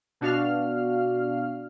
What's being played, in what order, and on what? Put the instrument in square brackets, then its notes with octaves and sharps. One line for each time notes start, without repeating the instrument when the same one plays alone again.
[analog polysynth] B2 D4 F#4 F5 F6